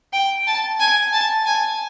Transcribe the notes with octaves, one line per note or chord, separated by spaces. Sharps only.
G5
A5
G#5
A5
G#5